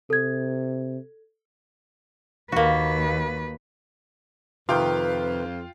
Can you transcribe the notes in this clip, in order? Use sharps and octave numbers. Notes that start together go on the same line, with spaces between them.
C3 A4 G#6
D#2 A#3 F#4 B4
F2 C3 D#3 F4 B4 G5